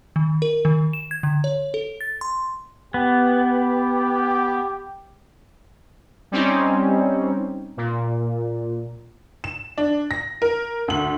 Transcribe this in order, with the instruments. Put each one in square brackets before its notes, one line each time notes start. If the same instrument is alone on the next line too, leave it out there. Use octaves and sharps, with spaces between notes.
[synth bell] D#3
A#4
D#3
E7
G#6
D3
C#5
A4
A6
C6
[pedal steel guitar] B3 [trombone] G4
[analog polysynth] G3 C4 C#4 D#4
A#2
[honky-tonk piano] E7
D4
A#6
A#4
D2 F#7